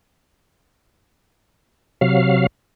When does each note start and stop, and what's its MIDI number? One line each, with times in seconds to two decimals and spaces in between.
2.01 2.47 48
2.01 2.47 54
2.01 2.47 77